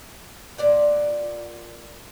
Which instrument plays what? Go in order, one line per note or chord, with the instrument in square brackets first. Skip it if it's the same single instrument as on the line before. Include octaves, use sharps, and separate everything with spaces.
[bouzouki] A#2 D5 F#5